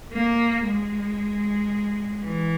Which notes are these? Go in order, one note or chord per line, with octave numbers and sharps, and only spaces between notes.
A#3
G#3
E3